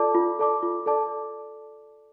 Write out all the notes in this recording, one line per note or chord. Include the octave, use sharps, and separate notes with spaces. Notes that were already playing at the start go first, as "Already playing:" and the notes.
Already playing: F4 A4 D5 A5 D6
F4
A4 D5 A5 D6
F4
A4 D5 A5 D6